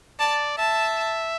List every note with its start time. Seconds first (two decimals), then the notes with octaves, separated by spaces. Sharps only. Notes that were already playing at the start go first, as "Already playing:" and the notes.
0.19 D5 A5
0.58 E5 A5